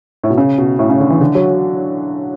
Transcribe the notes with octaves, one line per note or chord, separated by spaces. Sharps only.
A2
B2
C#3
B2
A2
C#3
D3
E3
D3
F#3